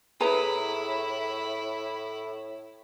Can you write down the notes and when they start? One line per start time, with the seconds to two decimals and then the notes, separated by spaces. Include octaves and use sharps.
0.20 A2 E4 G#4 B4 A#5